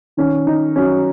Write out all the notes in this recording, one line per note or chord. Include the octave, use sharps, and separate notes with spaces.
D#3 C#4
D#3 D#4
F#3 C#4